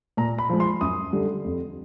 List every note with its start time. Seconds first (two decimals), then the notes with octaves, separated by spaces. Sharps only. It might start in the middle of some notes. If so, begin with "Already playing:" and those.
0.17 A#2 A#5
0.38 B5
0.49 F3 G#3
0.60 C6
0.81 F#2 D#6
1.13 D3 G3
1.45 F2